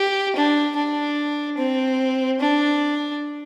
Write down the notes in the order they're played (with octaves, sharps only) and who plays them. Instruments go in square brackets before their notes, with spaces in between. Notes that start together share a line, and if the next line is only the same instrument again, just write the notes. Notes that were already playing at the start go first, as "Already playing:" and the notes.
Already playing: [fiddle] G4
D4
D4
C4
D4